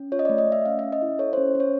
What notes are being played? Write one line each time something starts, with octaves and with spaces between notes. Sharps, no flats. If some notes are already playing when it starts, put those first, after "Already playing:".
Already playing: C#4
F4 C#5
D#5
A3 D5
D#5
A3 E5
C#4 F5
C#4 E5
D#5
E4
A4 C#5
C#4 C5
C#4 C#5